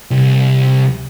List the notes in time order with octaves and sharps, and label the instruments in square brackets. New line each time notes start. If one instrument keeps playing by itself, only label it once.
[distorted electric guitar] C2